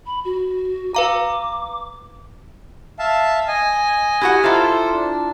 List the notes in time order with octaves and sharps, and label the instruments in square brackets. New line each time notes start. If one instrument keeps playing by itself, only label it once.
[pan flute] B5
F#4
[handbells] B4 F5 A#5 [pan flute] D6
[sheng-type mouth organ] E5 F5 A5
D#5 G#5
[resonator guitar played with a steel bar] E4 F#4 F#5 [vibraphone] G4
[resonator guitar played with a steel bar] E4 F4 [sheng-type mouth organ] A4 C5 [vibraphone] E5 A#5 D6
[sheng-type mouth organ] D4